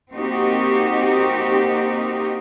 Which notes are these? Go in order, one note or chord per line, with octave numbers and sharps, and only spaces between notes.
A#3 C4 D#4 F#4 G4